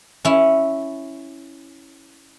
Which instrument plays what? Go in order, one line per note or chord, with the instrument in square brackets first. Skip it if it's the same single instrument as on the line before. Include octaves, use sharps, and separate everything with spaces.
[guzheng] C#4 E4